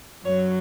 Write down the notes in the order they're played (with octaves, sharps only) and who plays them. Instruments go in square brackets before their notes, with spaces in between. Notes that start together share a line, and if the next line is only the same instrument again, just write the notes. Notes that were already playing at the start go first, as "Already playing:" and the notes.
[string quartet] F#2 F#3 C#5